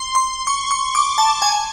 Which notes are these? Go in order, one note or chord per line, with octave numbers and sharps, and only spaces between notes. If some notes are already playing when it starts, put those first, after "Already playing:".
Already playing: C6
C6
C#6
C#6
D6
A5
G#5